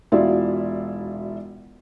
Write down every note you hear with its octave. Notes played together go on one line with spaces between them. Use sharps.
E1 F#3 E4 F4 D5